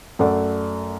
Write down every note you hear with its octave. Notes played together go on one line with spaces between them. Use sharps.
F#2 A3 A4 D5 F#5